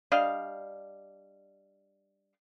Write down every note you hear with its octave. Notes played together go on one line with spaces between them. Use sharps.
G3 D4 D#5 F5